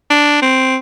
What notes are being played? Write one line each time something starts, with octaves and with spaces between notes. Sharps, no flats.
D4
C4